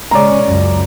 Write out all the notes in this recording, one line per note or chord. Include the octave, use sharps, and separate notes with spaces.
C#3 G#3 C#4 D5 A#5
C#2 F#2